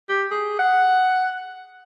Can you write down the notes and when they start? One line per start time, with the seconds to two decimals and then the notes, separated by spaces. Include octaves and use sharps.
0.09 G4
0.31 G#4
0.59 F#5